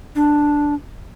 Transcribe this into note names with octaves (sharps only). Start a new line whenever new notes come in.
D4